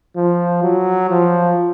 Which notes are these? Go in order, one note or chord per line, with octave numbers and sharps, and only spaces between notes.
F3
F#3
F3